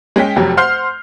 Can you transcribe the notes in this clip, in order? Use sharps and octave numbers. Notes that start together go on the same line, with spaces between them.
G#3 C#4 G5 B6
F1 F2 F#3 G4
C5 F#5 C6 F6 G6 C7